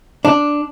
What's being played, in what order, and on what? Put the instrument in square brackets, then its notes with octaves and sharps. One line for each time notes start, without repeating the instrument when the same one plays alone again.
[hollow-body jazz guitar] D4